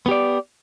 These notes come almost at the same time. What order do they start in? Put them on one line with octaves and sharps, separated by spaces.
B3 G4 D5